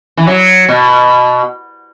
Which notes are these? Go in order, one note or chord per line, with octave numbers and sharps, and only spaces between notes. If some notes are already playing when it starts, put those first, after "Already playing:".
E3
F#3
B2